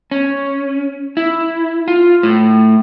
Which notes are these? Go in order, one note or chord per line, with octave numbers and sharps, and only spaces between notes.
C#4
E4
F4
A2